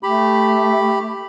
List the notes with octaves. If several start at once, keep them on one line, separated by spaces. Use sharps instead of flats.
A3 G4 B5